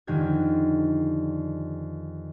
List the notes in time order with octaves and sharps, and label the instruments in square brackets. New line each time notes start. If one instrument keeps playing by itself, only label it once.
[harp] F2 D3 D#3 G#3 G4 G#6